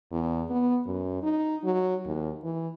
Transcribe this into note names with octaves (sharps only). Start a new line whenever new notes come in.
E2
B3
F#2
D#4
F#3
D#2
E3